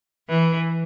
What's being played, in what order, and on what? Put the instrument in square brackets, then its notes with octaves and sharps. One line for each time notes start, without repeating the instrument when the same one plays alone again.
[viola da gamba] E3